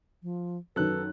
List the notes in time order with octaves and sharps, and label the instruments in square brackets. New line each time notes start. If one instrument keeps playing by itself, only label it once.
[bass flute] F3
[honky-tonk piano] F#2 D#3 [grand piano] A4 F#6 [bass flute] B4